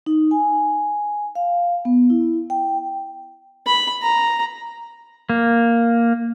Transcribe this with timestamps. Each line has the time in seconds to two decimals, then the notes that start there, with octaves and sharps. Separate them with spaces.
0.06 D#4
0.31 G#5
1.35 F5
1.85 B3
2.10 E4
2.50 G5
3.67 B5
4.02 A#5
5.30 A#3